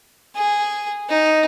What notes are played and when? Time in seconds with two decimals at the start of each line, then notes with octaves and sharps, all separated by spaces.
0.36 G#4
1.09 D#4